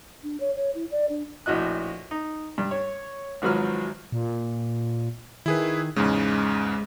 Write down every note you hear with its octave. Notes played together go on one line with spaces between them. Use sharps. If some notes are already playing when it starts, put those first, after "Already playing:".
D4
C#5
C#5
E4
D5
D4
A#1 A2 F#4 D#5 F#6
D#4
G2
C#5
G#1 G#2 F3 F#3 B4 F6
A#2
D#3 E4 G#4 B4
E2 G#2 C#3 G#3